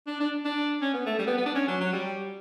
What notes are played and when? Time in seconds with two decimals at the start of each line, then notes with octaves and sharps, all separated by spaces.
0.07 D4
0.20 D4
0.45 D4
0.82 C#4
0.94 B3
1.06 A3
1.19 G3
1.27 B3
1.37 B3
1.46 D4
1.55 C#4
1.68 F#3
1.81 F#3
1.93 G3